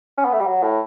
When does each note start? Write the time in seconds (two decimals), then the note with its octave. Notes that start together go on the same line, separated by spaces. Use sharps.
0.18 C#4
0.25 B3
0.33 A3
0.40 G3
0.47 F#3
0.63 A2